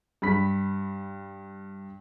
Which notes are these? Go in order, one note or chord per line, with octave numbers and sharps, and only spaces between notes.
G2 B5 B6